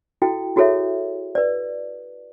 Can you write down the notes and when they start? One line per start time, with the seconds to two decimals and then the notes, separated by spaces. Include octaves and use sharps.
0.22 E4 F#4 A4 G5
0.56 E4 F#4 G#4 A4 C#5 E5
1.35 B4 D5